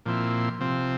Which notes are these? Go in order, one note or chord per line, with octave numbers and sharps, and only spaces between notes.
A#2 F3 C4 E4
C3 F3 C4